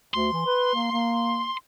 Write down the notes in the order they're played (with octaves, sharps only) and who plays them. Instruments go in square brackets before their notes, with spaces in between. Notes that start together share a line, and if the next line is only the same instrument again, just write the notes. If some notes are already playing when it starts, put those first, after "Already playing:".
[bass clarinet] D2 [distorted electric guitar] C6
[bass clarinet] E3
B4
A#3
A#3